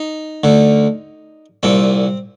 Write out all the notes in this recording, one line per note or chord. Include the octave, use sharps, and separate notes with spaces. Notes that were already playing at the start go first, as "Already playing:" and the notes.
Already playing: D#4
D2 D3
C2 A#2 C4